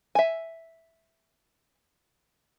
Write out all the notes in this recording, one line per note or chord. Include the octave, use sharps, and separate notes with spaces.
E5 G#5